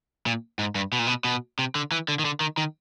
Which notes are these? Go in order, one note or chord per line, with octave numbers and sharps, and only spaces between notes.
A#2
G#2
G2
B2
A#2
B2
B2
C3
D3
E3
D3
D#3
D3
D#3
D#3